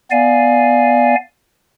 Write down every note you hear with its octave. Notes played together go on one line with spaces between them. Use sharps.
B3 D5 F5 G#5